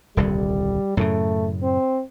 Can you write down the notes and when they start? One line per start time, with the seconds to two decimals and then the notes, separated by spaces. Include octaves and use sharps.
0.17 D#1 C2 D3 G3
0.97 F#2 A2 C#3 A3
1.63 C4